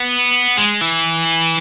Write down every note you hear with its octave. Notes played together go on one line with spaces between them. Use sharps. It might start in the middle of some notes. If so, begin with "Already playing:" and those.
Already playing: B3
G#3
E3